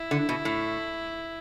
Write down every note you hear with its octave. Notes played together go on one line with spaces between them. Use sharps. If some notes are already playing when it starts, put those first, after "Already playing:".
Already playing: E4
D3
B2
A2